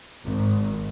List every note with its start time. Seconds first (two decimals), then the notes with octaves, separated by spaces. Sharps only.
0.24 G#1